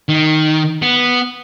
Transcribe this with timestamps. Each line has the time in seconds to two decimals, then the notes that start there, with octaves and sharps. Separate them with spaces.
0.09 D#3
0.82 B3